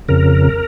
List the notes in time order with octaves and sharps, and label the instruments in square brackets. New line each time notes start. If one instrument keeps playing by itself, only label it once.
[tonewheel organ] F2 C#3 A#4